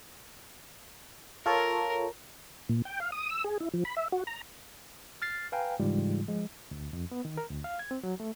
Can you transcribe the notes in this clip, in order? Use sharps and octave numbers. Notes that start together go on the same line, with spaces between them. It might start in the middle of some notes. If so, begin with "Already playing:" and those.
F4 A4 A#4 C#5
A#2
G5
F5
D#6
E6
G#4
E4
F3
B5
E5
F#4
A#5
F6 A6 C7
B4 F5 G5 G#5 A#5
G#2 C#3 E3 G3 G#3 F4
F3 G#3
D2
F2
B3
D#3
A#4
D2
F5
G#6
C4
F#3
A3